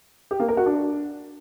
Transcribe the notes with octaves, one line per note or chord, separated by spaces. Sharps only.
G4
A#3
A#4
F#4
D4